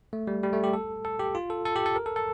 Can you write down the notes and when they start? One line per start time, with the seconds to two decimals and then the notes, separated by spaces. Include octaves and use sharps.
0.13 A3
0.27 G3
0.43 G3
0.53 A3
0.64 G4
0.73 A4
1.05 A4
1.19 G4
1.35 F4
1.50 A4
1.65 A4
1.76 G4
1.86 A4
1.96 A#4
2.06 A4
2.16 A4